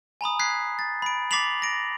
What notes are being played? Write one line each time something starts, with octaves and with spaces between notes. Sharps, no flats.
G#5 A#5 B5 D#6
F#6 G#6 B6 C7
A6
B5 D7
D6 A6 B6 C7 F7 F#7
A#6 D7